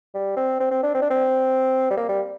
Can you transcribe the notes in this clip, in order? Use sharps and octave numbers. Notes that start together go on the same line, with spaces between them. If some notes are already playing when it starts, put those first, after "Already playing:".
G3
C4
C4
C4
D4
C4
D4
C4
G3
A#3
G3